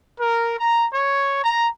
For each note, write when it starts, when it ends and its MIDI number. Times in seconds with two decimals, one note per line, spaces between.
0.19 0.57 70
0.58 0.85 82
0.94 1.43 73
1.43 1.67 82